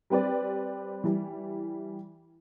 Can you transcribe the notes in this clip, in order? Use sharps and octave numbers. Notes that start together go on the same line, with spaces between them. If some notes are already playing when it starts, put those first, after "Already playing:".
G3 C4 G4 B4 D5
E3 G3